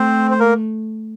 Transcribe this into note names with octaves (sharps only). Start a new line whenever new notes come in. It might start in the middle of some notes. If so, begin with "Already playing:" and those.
Already playing: A3 C4 C5
C5
A#3 A#4